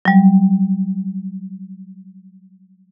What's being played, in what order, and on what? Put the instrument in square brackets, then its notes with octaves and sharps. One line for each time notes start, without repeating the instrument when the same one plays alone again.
[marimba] F#3 G3